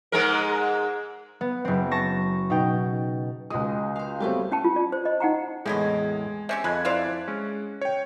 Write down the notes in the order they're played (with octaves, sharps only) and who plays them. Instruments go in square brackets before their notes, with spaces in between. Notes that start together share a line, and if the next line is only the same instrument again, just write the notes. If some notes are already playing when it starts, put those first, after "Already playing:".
[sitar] G#2 G#3 A#4
[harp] B3
F#1 C4
A5 C#6 A#6
B2 D#4 G5
[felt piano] C#2 D#6 [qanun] G#3 F#4
[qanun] C5 F5
[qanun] F#3 B3 D6 [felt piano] G3 A3 C4
[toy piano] C#4 G5 A5
F4
D5
C5
D#5
D#4 F#5 G5 A#5
[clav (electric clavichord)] E2 A2 [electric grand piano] G#3 G#6 [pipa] C4 E4 D#5
[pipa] C4 C#4 G4 [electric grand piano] E5
[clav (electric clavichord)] F2 [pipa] G#3 [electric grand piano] B5 F#6 G#6
[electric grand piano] E4 D5 [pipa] C5 E5 F5
[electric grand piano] G#3 [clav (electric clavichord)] C#4
[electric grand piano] C#5 G5